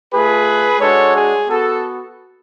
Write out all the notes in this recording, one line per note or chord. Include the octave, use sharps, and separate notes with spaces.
A3 F4 G#4 B4
G#3 D4 F#4 A4 C#5
G#4
B3 F#4 A4